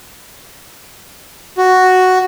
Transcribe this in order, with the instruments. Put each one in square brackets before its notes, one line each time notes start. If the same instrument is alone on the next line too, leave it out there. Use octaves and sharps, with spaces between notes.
[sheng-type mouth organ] F#4